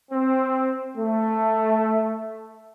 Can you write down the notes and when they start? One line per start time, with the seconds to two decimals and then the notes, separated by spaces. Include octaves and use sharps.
0.11 C4
0.97 A3